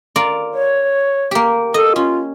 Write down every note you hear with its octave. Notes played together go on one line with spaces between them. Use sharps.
F4 A#4 D5
C#5
A#3 G4
A4 D#5
C#4 F4